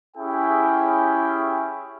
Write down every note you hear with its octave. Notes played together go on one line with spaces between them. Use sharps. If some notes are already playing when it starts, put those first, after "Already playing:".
C#4 E4 G4 G#4 G5